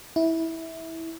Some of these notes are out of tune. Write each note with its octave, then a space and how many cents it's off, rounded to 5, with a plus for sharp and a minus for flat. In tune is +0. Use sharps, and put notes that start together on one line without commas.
E4 -15